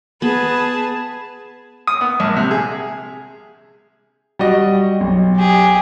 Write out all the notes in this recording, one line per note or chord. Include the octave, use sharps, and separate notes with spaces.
B3 G#4 B4 A5
D#6
B3
A#1
C3
G#4
G3 F#4 D#5
B1
G4 G#4